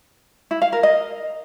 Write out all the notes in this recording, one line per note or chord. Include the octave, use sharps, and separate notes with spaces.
E4
F5
A#4
D#5